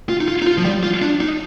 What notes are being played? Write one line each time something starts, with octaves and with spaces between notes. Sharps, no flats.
F4
D#4
F4
D#4
F4
F3
G3
F4
D4
D#4